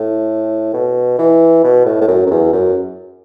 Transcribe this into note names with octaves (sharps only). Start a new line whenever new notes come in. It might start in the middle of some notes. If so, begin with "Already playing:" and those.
Already playing: A2
B2
E3
B2
A2
A2
F#2
F#2
E2
F#2